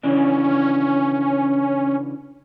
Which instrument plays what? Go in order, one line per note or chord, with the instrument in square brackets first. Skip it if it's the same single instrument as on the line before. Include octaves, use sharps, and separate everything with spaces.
[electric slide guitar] C#3 E3 D4 [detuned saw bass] C#4